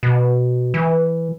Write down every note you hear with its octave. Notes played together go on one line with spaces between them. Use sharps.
B2
E3